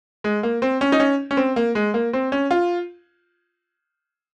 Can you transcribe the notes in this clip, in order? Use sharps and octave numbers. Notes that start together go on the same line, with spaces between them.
G#3
A#3
C4
C#4
D#4
C#4
C#4
C4
A#3
G#3
A#3
C4
C#4
F4